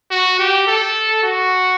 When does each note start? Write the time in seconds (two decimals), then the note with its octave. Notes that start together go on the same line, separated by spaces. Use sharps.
0.11 F#4
0.39 G4
0.67 A4
1.23 F#4